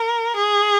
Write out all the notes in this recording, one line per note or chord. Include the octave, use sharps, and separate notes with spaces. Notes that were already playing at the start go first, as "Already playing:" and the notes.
Already playing: A#4
G#4